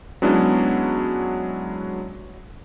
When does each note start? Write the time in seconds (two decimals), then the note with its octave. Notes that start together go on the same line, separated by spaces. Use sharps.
0.22 F#3 G#3 B3 C#4 D4 E4